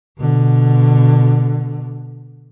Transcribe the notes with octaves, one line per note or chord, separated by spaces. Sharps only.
B2 D3